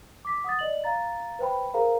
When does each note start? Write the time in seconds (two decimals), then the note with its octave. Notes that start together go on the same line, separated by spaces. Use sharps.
0.25 D6 B6
0.44 F#5 D#6 A6
0.59 D5 D#5 F#7
0.84 F5 A#5 A6
1.39 B4 C5 G5 B5
1.74 G#4 A#4 C5 F5 A#5